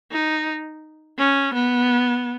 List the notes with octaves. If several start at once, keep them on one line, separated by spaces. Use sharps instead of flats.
D#4
C#4
B3